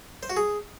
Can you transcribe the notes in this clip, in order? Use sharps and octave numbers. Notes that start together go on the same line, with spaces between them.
C5
F#4
G#4